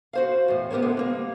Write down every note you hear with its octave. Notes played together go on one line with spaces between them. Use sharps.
F#4 C5 F5
E2 A2
B3 G4 A#4 C5 C#5
D3 G#3 B3
G3 A#3